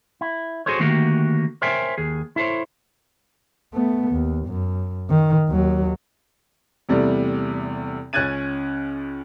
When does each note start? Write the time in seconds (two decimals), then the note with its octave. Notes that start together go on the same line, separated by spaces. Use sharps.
0.21 E4
0.66 F#4 G#4 A4 C5 C#5
0.79 D3 D#3 A3 A#3 F#4 G4
1.62 A#4 C5 C#5 E5 G5 G#5
1.98 D#2 G#4
2.36 E4 A4 C5 C#5
3.73 A3 B3
4.11 D#2
4.48 F#2
5.10 D#3
5.49 D#2 F#3
6.89 E2 C3 G3 A3
8.13 C#2 C#4 F#6 G#6 A6 D#7